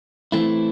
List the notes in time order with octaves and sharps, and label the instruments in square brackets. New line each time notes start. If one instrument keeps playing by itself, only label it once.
[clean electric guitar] E3 A3 C4 E4